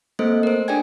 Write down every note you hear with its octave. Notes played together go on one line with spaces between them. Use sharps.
A3 A#3 C4 A4 C5 D#5
A#4 C5
D4 G#4 D5 G5 G#5 G#6